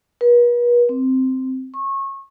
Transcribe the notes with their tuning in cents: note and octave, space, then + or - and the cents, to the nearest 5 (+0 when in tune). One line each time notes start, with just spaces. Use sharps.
B4 -45
C4 -5
C#6 -25